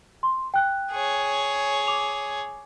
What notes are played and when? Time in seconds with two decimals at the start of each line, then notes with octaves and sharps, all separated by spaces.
0.23 C6
0.54 G5 F#6
0.92 G#4 C#5
1.87 D6 F7